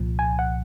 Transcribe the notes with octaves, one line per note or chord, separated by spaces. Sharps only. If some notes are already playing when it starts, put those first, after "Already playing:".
Already playing: C2 A#2 F3
G#5
F#5